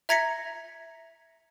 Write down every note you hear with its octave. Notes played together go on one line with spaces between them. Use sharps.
E5 A#5 G#6 A#6 B6 C#7